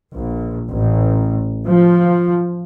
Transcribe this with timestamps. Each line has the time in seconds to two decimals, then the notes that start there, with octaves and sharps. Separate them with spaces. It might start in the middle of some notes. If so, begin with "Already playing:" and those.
0.15 A#1
0.69 A1
1.67 F3